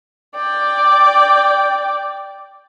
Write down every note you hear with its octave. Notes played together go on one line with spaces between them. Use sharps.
D5 G5